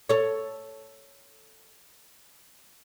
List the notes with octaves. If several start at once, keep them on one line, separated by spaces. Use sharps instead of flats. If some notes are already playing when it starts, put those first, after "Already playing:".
A4 C#5